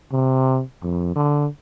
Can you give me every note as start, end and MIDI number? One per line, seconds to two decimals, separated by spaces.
0.12 0.62 48
0.83 1.14 41
1.15 1.47 50